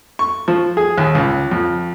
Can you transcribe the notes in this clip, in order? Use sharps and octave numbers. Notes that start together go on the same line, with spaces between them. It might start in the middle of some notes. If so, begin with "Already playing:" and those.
C#6
F3
G#4
D#2
C#2
F2